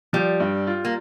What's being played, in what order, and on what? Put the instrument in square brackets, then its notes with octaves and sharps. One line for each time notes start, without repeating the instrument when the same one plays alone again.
[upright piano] F3 [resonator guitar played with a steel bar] G3
[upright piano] G2
F4
[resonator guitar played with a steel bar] A#3